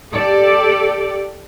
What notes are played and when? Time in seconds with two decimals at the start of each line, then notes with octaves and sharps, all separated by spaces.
0.15 G4 A4 D5